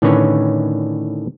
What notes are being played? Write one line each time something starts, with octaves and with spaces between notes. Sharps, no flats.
A2 D3 D#3 C#4 B4 C#5